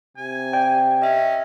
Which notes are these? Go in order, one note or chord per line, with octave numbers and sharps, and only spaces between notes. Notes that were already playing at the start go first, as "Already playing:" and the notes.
C3 G#5
D5 G5
C#4 D#5 E5